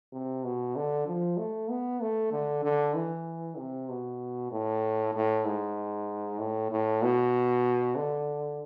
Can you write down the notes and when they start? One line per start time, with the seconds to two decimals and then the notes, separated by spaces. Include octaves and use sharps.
0.13 C3
0.44 B2
0.76 D3
1.07 F3
1.38 A3
1.70 B3
2.02 A3
2.32 D3
2.64 D3
2.94 E3
3.57 C3
3.89 B2
4.52 A2
5.14 A2
5.45 G#2
6.39 A2
6.71 A2
7.02 B2
7.96 D3